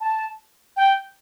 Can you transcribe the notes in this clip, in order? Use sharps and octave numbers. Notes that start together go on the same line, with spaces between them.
A5
G5